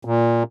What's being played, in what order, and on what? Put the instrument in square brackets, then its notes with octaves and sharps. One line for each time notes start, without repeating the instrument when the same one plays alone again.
[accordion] A#2